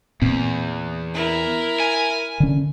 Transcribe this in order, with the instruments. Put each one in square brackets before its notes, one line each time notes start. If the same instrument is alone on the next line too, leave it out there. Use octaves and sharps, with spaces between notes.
[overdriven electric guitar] E2 [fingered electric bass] A#2 C4
[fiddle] E4 A#4
[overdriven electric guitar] G#5
[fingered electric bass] D3 C#4